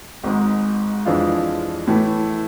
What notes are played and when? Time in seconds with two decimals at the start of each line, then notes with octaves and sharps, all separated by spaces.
0.24 G#1 G#2 G#3
1.06 F2 E3 G#3 D4 F4
1.87 A2 E3 A3